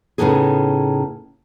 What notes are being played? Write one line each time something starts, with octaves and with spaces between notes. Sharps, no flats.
A2 C#3 B3 D4 D#4 G#4